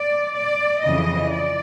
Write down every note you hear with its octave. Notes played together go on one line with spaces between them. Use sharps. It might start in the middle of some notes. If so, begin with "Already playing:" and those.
Already playing: D5
D5
F2 C#3 E3 D#5
D5